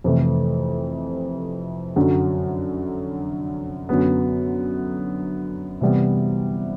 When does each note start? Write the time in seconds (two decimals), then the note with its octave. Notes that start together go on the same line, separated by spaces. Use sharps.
0.04 F2 C3 E3 A3 C4
1.96 F#2 D3 F#3
3.89 F#2 D3 F#3 B3
5.81 C3 E3 G3 B3